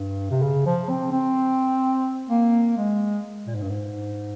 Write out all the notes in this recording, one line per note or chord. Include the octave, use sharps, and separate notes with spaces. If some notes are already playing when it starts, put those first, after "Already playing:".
Already playing: G2
C3
C#3
F3
C4
C4
A#3
G#3
A#2
G#2
G2
G#2